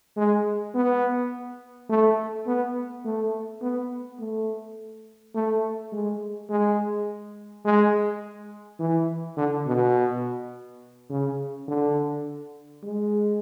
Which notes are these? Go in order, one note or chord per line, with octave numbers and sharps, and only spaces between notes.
G#3
B3
A3
B3
A3
B3
A3
A3
G#3
G#3
G#3
E3
D3
B2
C#3
D3
G#3